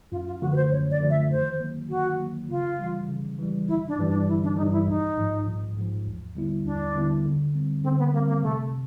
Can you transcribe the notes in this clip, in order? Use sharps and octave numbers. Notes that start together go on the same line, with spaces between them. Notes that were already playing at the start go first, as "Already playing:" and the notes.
F#2 F4
F4
D3 F3 A3 F#4
B4
C5
F#2 C#5
D5
D3 F3 A3
E5
D#3 C5
F#3 A#3
D#3 F#4
F#3 A#3
C#3 F4
E3 G3
C#3
E3 G3
G1 E4
D4
G2 E3 G3
D4
G1 E4
D4
G2 E3 G3 D#4
E4
A#1 D#4
G#2 F3
A#1
G#2 F3
D#2
D3 G3 B3 E4
D#2 D4
D3 G3 B3 E4
D3
G3 C4
D3 C4
B3
G3 A#3 C4
A#3
C3 A3